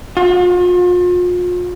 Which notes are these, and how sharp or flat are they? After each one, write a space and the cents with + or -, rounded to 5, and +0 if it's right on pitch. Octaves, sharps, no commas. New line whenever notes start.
F4 +40